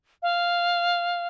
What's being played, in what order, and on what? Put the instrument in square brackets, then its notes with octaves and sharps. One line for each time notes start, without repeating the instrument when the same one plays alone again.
[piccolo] F5